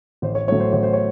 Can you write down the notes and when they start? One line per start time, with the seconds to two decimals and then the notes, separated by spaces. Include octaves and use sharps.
0.22 A1 C5
0.35 C#5
0.47 A2 F#3 A3 C#5
0.60 C5
0.73 A1 C#5
0.83 C5
0.93 C#5